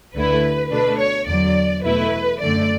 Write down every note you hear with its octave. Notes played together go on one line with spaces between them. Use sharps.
D2 D3 A3 E4 B4
B2 A3 D4 B4
C#5
E2 D3 F#3 D5
E2 B2 A3 E4 B4
F#2 D3 A3 D5